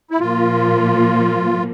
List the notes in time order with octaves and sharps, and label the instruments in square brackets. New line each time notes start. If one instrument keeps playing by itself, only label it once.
[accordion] E4
[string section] A#2 F3 A#3 [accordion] F4